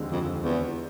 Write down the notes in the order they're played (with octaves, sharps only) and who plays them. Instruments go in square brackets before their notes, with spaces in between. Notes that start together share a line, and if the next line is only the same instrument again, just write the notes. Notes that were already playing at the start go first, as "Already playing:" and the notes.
Already playing: [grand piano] D#2 D3 F3 G#3 C4
[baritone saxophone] F2
E2